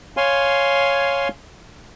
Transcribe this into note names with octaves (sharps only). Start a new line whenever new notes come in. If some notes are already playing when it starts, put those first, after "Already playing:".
C#5 F5 G#5 C6